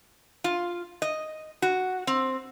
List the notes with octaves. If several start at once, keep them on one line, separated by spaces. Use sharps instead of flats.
F4
D#5
F#4
C4